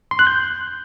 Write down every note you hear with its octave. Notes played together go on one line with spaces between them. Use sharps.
C6
F#6
G6